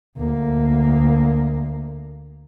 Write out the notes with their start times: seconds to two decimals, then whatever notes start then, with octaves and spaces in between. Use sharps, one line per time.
0.17 D2 A#3